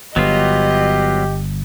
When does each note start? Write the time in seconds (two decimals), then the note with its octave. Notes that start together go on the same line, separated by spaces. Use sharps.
0.16 G1 F#3 B3 F4 G4 D#5